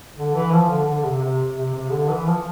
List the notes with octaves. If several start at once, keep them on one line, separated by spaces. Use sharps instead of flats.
D3
E3
F3
D3
D3
C3
C3
C3
C3
D3
E3
F3